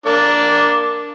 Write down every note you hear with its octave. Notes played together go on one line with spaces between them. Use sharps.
A#3 D4 D5